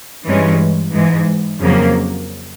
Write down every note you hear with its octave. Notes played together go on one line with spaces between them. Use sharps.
G2 E3 G#3 C#4
G#2 E3 G#3
F2 C#3 F#3 A#3